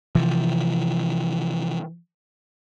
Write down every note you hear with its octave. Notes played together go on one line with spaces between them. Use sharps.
C3 E3 F3